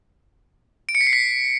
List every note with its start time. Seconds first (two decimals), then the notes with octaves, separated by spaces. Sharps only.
0.89 D7
0.95 C#7
1.01 B6
1.07 C7
1.13 B6